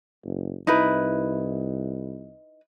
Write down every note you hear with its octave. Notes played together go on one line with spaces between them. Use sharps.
F#1
C2 D#4 E4 B4